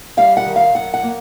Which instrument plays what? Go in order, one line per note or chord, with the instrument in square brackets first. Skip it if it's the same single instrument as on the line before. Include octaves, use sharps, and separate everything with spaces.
[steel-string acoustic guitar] G3 F5
F#5
D#3
F5
F#2 F#5
F#5
A#3